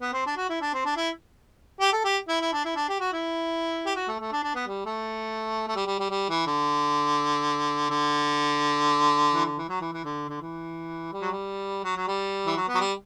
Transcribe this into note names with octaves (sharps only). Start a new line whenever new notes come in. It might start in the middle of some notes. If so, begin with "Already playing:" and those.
B3
C4
D4
F#4
E4
D4
C4
D4
E4
G4
A4
G4
E4
E4
D4
E4
D4
G4
F#4
E4
G4
F#4
A3
A3
D4
D4
B3
G3
A3
A3
G3
G3
G3
G3
E3
D3
D3
E3
D3
E3
F#3
E3
E3
D3
D3
E3
G3
F#3
G3
F#3
F#3
G3
E3
F#3
B3
F#3
G3